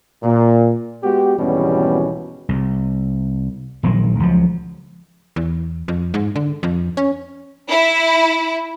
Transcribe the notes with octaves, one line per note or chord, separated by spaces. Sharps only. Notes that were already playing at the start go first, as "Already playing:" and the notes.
A#2
G#3 B3 F#4 G4
G#1 E2 B2 G3 C#4
C2
D#1 A#1 D#3 F#3
C#2 F3 F#3
E2
F2
G#2
D3
F2
C#4
E4